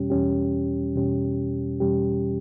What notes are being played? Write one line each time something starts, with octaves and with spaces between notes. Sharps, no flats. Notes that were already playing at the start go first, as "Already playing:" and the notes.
Already playing: E2 B2 G3 C#4 G4
E2 B2 G3 C#4 G4
E2 B2 G3 C#4 G4
E2 B2 G3 C#4 G4